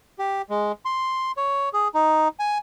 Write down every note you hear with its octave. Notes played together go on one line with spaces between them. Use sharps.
G4
G#3
C6
C#5
G#4
D#4
G#5